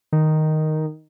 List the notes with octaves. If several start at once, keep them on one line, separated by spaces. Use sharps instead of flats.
D#3